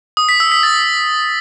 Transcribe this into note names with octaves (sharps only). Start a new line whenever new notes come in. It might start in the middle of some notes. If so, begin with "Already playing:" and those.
D#6
B6
E6
B6
A6